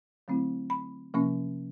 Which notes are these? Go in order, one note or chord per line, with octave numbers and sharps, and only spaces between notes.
D3 F#3 A3 C4 E4
B5
C3 F3 A#3 C#4